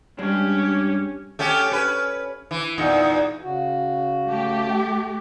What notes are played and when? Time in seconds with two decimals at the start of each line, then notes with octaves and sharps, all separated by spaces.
0.19 G2 G#3 C#4 D4 G4
1.39 A3 C#4 G4
1.72 C#4 B4
2.51 E3
2.78 E2 A#2 D#4
3.43 C#3 F#4
4.28 A3 G4